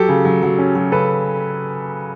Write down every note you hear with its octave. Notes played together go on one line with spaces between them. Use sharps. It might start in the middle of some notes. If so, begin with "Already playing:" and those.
Already playing: F#3 G4 A4
C#3
F#3
F#3
C#4
F#3
C#3 A4 B4